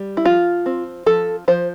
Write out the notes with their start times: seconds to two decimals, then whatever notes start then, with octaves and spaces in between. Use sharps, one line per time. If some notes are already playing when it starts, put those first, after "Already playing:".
Already playing: G3
0.17 E4
0.25 F3 F4
0.66 C4
1.06 F3 A4
1.48 F3 C5